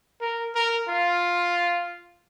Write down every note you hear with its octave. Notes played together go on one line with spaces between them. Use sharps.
A#4
A#4
F4